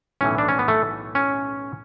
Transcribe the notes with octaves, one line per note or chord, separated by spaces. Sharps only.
B1 A2 E3 C#4
D4
C#4
B3
A3
C#4